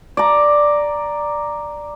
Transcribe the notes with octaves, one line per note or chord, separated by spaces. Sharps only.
D5 A#5